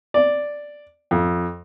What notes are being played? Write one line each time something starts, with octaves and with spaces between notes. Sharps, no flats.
D5
F2